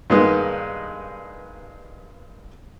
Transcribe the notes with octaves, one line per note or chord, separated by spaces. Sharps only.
G2 D#3 G#3 A#3 B3 D#4